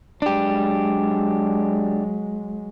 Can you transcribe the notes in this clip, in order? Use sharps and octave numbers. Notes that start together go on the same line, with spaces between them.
F#3 G#3 D4 G4